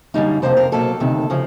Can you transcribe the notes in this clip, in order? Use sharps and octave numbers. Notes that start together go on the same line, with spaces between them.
F#2 D3 G3 A#3 D#4
F2 C3 F3 A#3 C5
A#4
B2 F#3 A#3 A4
D2 C3 D#3
C#3 F3